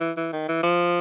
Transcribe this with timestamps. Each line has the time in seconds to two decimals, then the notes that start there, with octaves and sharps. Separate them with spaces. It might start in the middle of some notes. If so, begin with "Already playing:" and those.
0.01 E3
0.17 E3
0.33 D#3
0.48 E3
0.63 F3